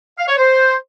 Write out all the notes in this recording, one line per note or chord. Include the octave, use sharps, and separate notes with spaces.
F5
C#5
C5